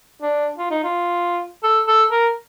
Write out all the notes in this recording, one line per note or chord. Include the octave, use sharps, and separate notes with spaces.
D4
F4
D#4
F4
A4
A4
A#4